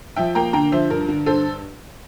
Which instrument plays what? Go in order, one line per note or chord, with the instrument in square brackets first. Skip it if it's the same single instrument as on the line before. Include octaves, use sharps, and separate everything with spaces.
[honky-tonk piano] F3 E5 G5
A#3 G5 A#5
D3 G5 A#5
F3 C5 E5
G2 A#4
D3
G2 A4 C5